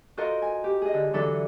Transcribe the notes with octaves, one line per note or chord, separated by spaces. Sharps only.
F4 F#4 A4 A#4 C5 D#5
G#5
G4
G#4 D#5
D3
D3 E3 F#3 D4 A4 B4